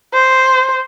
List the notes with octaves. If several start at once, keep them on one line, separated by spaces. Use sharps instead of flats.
C5